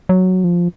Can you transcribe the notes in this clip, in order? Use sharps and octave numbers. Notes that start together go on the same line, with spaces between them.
F#3
F3